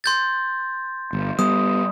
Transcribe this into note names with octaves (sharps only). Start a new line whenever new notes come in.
C6 G6 A6
G1
G3 B3 D#6